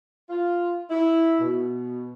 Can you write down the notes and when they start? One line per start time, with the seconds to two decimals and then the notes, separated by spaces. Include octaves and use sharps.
0.30 F4
0.90 E4
1.41 B2